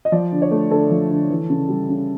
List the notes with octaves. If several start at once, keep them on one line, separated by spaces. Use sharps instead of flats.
D#5
F3 D5
D3
C#5
A3
D3 A4
F3
D3
E3
C#3
G3
C#3